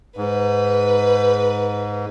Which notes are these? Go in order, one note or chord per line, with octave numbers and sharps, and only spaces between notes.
G#2 B4